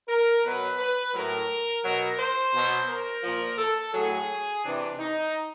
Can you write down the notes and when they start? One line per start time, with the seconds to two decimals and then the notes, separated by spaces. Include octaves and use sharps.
0.09 A#4
0.44 B2 F#3 B4
0.79 B4
1.14 A2 F#3 A#4
1.84 B2 F#3
2.19 C5
2.54 B2 F#3
2.88 A#4
3.24 A#2 F3
3.59 A4
3.94 A2 F#3 G#4
4.64 C3 E3 D4
4.99 D#4